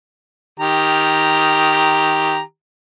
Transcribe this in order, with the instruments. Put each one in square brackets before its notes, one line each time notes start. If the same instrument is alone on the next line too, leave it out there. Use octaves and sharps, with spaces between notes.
[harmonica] D#3 G4 A#5